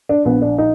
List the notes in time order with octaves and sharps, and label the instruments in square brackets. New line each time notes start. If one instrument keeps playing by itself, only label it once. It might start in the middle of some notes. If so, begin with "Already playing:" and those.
[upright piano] D4
A#1 B3
D4
D#4